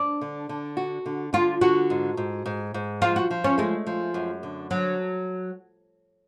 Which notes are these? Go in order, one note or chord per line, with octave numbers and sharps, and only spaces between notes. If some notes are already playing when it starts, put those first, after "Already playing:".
Already playing: D4
D3
D3
F#4
D3
D3 F4
D3 F#4
G#2
G#2
G#2
G#2
F3 F4
F#4
F3
C#4
G#3 A3
F3
F#2
D3
D3 F#3